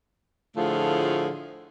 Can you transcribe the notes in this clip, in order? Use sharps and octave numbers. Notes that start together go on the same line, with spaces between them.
A2 D3 F3 A3 F4 G#4